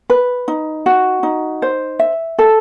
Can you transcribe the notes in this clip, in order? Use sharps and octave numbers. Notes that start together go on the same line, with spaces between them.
B4
D#4
F#4
D#4
C5
E5
A4